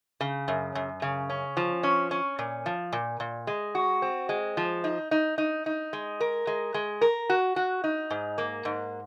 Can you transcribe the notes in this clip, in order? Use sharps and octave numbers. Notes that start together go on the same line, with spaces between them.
C#3
F#2
F#2
C#3
C#4
F3
C#4
C#4
A#2
F3
A#2
A#2
G#3
F#4
C4
G#3
F3
D#4
D#4
D#4
D#4
G#3
A#4
G#3
G#3
A#4
F#4
F#4
D#4
G#2
A#3
G#2